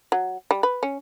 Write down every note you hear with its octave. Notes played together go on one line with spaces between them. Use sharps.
F#3
G3
B4
C#4